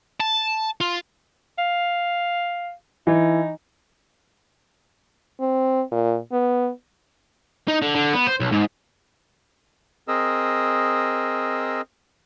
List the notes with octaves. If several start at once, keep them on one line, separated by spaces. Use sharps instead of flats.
A5
F4
F5
E3 D#4
C4
A#2
B3
D#4
D3
D3
B3
C5
B1
G#2
C4 G#4 A#4 D#5 E6